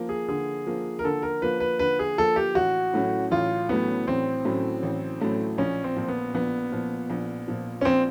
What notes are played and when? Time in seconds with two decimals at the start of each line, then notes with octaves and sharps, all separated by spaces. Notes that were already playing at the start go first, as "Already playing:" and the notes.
Already playing: F3 A#3
0.09 G#4
0.29 D3 G#4
0.66 F3 A#3
0.99 A#4
1.04 D3 A4
1.23 A#4
1.42 F3 A#3 B4
1.60 B4
1.79 D3 B4
1.99 G#4
2.18 F3 A#3 A4
2.36 G4
2.55 A1 F#4
2.93 A2 F#3 A3 C#4
3.31 A1 F4
3.69 A2 F#3 A3 B3 C#4
4.07 A1 C4
4.45 A2 F#3 A3 C#4
4.83 A1
5.20 A2 F#3 A3 C#4
5.58 A#1 C#4
5.84 C4
5.96 A#2 F3
6.08 B3
6.34 A#1 B3
6.72 A#2 F3
7.10 A#1
7.48 A#2 F3
7.81 C#4
7.85 A#1 C4